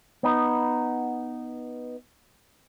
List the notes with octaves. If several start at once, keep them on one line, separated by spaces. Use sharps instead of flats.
B3 D#4